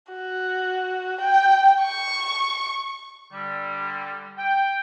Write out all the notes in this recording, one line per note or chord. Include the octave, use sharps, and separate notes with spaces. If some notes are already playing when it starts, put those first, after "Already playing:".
F#4
G5
C#6
D3 G3
G5